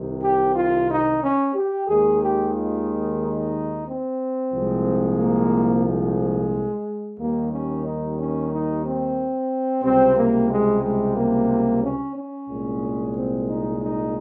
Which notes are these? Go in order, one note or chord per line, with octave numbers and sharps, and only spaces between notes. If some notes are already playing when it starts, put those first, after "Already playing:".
Already playing: C2 C3 D#3
G4
F4
D#4
C#4
G4
D#2 D#3 G#3 G#4
G4
F4
D#4
C4
C2 A#2 F3 G#3
A#3
G#3
D#2 D#3 G3 A#3
C#4
D#4
C#4
D#4
C4
C#2 C3 G3 C4
A#3
G#3
G#3
A#3
C#4
C#4
C2 A#2 G#3
C4
D#4
D#4